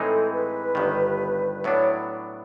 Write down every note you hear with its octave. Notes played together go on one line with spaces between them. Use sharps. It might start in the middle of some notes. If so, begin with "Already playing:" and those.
Already playing: A2 E3 G#3 C4 D#4 A4
B4
G1 G2 D#3
A2 F#3 B3 D4 C#5